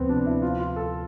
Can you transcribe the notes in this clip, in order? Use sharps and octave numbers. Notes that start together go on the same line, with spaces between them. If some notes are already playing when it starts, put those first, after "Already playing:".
Already playing: D2 C3 F3 B3 C4
D4
E4
F4
F4
A4